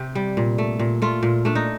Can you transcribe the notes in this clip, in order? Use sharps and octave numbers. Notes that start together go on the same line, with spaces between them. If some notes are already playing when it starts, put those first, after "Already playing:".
Already playing: C3 G4
G3
A#2
A3
A#2
A3 F4
A#2
A3 D4
D#4